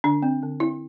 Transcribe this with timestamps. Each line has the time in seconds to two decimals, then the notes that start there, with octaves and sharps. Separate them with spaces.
0.04 D3 D4
0.22 C4
0.42 D3
0.60 C4 E4